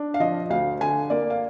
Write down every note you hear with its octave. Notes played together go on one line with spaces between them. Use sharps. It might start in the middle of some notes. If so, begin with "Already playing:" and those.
Already playing: D4
F5
F3 D#5
D2 F5
D3 G#5
A#3 D5
F5